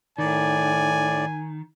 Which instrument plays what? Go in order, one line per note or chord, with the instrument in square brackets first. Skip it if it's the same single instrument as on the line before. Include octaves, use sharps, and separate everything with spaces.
[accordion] A2 D5 [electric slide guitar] D#3 [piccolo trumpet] G#5